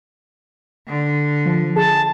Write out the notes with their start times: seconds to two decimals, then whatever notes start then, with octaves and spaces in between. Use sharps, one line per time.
0.89 D3
1.46 F3
1.76 G#4 A5